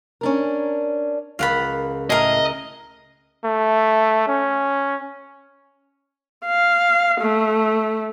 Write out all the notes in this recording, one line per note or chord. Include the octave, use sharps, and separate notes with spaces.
C#4 D4 A#4
C#2 F4 A#4 F5 F#5 B5 A6
A2 G#4 A#4 D#5 F6 F#6
A3
C#4
F5
A3